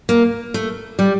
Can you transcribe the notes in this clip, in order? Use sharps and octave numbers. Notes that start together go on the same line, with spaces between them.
A#3
A3
G3